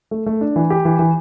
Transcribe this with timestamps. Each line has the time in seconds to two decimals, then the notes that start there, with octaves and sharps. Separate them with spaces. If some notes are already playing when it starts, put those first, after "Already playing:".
0.11 A3
0.26 A3
0.41 D4
0.56 E3
0.70 G4
0.85 E3
0.99 E3